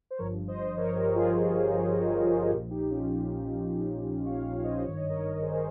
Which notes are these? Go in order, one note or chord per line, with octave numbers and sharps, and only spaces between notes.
C5
G1 G2 F3 A#4 C#5
C5 D#5
A#4 C#5
G4 A#4
F4 G#4
A#1 A#2 F3 G4 A#4
D#4 G4
C#4 F4
D#4 G4
C#5 F5
C#5 F5
C#5
C5 D#5
G#1 G2 D#3 C#5
D#5
A#4 C#5
G#4 C5